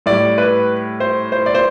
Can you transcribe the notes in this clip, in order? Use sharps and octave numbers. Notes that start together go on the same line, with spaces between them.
A2 G3 D5
B4
C5
C5
D5
C5